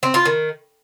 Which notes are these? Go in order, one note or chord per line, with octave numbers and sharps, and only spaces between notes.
C4
F4
D#3